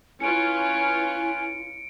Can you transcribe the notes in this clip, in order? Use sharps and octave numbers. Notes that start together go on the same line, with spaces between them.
C#4 E4 F4 B4 G#5 C#7 D7